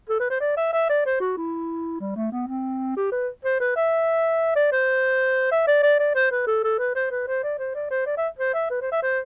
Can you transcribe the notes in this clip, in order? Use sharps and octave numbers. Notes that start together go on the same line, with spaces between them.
A4
B4
C5
D5
E5
E5
D5
C5
F#4
E4
G3
A3
B3
C4
G4
B4
C5
B4
E5
D5
C5
E5
D5
D5
D5
C5
B4
A4
A4
B4
C5
B4
C5
D5
C5
D5
C5
D5
E5
C5
E5
B4
C5
E5
C5